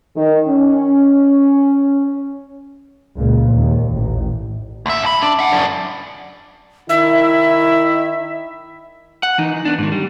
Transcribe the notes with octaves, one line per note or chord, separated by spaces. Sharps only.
D#3
C#4
C#2 A#2
D#2
A1
D2 E5
D#2 B5
D4
E5 F#5
F#2 D4
D#3 E4 E5
F#5
E3 D#4
B3 D4
G#2 D#3
G3